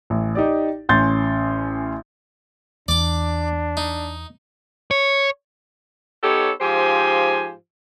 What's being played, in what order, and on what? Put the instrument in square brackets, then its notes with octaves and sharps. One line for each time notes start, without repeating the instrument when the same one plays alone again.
[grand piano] A1
D#4 G4 D5
A1 C#4 C6 G6 A6
[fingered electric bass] E2 [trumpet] D4 [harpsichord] D5 D6
[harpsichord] D#4
[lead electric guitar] C#5
[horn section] B3 D#4 G4 A4 C#5
G#2 F3 G4 C5 F5 G#5